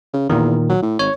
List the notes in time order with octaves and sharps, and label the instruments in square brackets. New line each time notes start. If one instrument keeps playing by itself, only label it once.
[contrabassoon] C#3
[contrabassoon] E2 [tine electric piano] A#2 D#3
[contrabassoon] F#3
A2
[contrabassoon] G#1 [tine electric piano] C#5